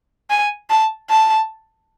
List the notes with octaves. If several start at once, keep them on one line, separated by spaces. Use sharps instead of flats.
G#5
A5
A5